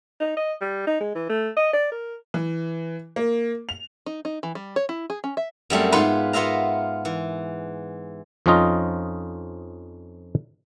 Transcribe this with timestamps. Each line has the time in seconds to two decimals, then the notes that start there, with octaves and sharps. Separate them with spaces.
0.20 D#4
0.37 D#5
0.61 G3
0.87 D#4
1.01 G#3
1.15 E3
1.29 A3
1.57 D#5
1.73 D5
1.92 A#4
2.34 E3
3.16 A#3
3.69 F7
4.06 D#4
4.25 D#4
4.43 E3
4.55 G3
4.76 C#5
4.89 E4
5.10 G#4
5.24 C#4
5.37 E5
5.70 F#2 G3 A3 C4
5.92 G#2 B3 F4 B4 B5 C6
6.33 B3 F4 E5 F5 A#5
7.05 E3
8.46 F2 F3 C#4 D#4 F4 D#5